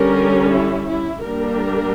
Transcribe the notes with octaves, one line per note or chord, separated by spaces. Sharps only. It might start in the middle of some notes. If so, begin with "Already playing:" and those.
Already playing: D3 G3 C#4 A#4
E4
E4
G3 A#3 D4 A#4